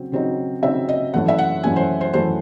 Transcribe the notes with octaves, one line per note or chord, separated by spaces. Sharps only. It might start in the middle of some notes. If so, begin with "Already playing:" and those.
Already playing: C#3 F#3 C4
C#3 F#3 C4 D#4
C#3 F#3 C4 D#4 E5
D#5
F#2 E3 A3 C#4 F#5
E5
F#5
F#2 E3 A3 C#4 G#5
C5
C5
F#2 E3 A3 C#4 C5